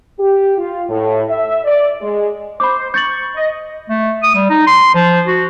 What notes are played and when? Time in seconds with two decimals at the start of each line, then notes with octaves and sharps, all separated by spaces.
0.19 G4
0.58 F4
0.89 A2
1.29 E5
1.65 D5
2.01 G#3
2.60 C5 B5 D6
2.94 C#6 G6 A6 F#7
3.36 D#5
3.89 A3
4.23 D#6
4.35 G3
4.50 D#4
4.67 C6
4.94 F3
5.26 F#4